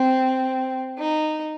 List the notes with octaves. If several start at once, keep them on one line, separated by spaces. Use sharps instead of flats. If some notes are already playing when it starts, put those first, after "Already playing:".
Already playing: C4
D#4